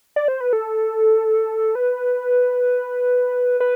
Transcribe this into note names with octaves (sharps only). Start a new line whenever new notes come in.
D5
C5
B4
A4
B4
B4